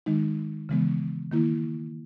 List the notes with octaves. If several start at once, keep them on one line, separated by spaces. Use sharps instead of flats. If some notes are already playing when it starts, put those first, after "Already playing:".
D#3 G#3 D#4
C#3 E3 G#3 B3
D#3 A#3 E4